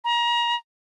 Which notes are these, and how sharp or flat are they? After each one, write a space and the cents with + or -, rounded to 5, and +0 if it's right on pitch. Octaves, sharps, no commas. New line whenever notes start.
A#5 +30